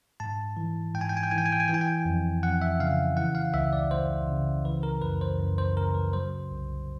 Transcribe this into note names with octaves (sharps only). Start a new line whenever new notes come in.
G#2 A5
E3
G#2 G5
G#5
G5
G#5
G5
E3 G#5
G5
G#5
G5
G#5
E3 G5
G#5
G5
F2
F2 F#5
E5
C#3 F5
E3 F#5
F5
C#2 E5
D5
C#2 C5
C#3
E3 B4
A#4
F#2 B4
C5
F#2
C5
C#3 A#4
B4
F#3 C5
C2